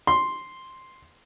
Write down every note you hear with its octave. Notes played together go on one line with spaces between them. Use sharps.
C6